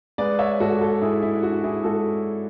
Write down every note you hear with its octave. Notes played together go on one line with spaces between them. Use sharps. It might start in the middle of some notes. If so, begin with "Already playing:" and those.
G#3 B4 D5
C#5 E5
G#2 F#4 A4
F#4 A4
G#2 E4 G#4
E4
D4 F#4
E4 G#4
G#3 F#4 A4